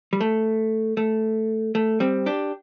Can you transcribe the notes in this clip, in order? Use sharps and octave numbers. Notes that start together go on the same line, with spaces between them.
G3
A3
A3
A3
G3 C4
D4 G4